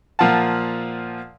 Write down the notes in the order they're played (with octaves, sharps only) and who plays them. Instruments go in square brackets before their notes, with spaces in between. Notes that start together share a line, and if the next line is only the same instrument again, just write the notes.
[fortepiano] A#2 F3 F5 F#5 A5